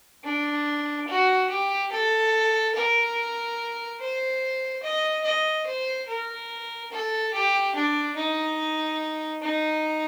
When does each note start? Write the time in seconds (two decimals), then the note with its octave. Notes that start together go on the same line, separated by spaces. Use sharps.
0.24 D4
1.08 F#4
1.50 G4
1.91 A4
2.75 A#4
4.00 C5
4.82 D#5
5.24 D#5
5.66 C5
6.08 A#4
6.92 A4
7.33 G4
7.75 D4
8.16 D#4
9.42 D#4